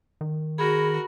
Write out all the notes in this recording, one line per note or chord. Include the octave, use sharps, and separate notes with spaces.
D#3
F#4 G#4 A#4 B5